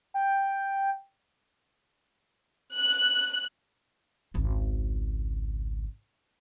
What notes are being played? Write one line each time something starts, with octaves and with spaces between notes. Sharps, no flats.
G5
F#6
G#1 C#2